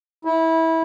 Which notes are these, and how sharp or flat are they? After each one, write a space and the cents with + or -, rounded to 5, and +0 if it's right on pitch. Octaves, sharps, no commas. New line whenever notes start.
E4 -20